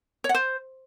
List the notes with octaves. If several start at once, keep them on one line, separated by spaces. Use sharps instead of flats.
C#5
F#5
C5